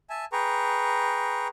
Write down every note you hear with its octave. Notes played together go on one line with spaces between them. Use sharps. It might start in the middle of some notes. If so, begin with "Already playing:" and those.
E5 G#5 A5
G#4 B4 G5 A#5 C#6